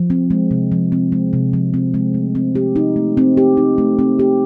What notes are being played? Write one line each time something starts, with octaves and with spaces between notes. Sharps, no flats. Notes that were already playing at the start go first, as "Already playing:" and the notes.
Already playing: F3
C4
G#3
C3
F3
C4
G#3
C3
F3
C4
G#3
A3
C4
G4
D#4
A3
C4
G4
D#4
A3
C4
G4